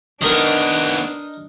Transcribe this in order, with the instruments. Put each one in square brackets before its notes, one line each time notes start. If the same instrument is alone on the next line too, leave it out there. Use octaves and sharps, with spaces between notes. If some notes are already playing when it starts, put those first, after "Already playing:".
[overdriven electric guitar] D#3 B3 [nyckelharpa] D4 [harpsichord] D#4 A#4